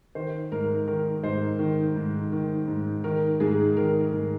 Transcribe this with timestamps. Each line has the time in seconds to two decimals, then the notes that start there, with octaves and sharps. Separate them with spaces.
0.15 D#3 C5
0.52 G#2 A#4
0.88 D#3 A#4
1.23 G#2 C5
1.59 D#3
1.96 G#2
2.32 D#3
2.67 G#2
3.04 D#3 A#4
3.40 G#2 G#4
3.77 D#3 A#4
4.01 A#4
4.13 G#2